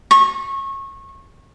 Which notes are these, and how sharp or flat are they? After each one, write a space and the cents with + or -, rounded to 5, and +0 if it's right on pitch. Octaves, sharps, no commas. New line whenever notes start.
C#6 -25